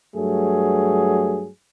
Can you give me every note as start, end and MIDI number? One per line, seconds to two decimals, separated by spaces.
0.16 1.48 43
0.16 1.48 54
0.16 1.48 57
0.16 1.48 68